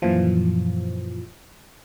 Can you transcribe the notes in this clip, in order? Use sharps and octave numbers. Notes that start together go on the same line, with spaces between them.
F#2 A#2 E3 F3